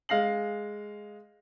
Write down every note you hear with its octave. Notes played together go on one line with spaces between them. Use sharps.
G#3 F5 A#6 C7 F#7